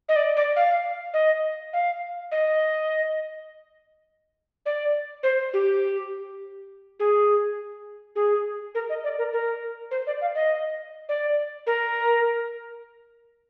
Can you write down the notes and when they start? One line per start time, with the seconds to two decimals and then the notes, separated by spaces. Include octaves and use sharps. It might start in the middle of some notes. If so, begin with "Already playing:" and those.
0.09 D#5
0.16 D5
0.37 D5
0.56 F5
1.14 D#5
1.73 F5
2.32 D#5
4.66 D5
5.23 C5
5.54 G4
7.00 G#4
8.16 G#4
8.75 A#4
8.89 D#5
9.04 D5
9.19 A#4
9.33 A#4
9.91 C5
10.07 D5
10.21 F5
10.35 D#5
11.09 D5
11.67 A#4